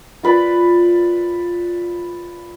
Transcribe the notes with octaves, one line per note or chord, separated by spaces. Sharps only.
F4 B4 D5